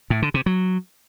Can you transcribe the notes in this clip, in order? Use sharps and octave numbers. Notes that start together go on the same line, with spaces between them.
A2
D3
C3
F#3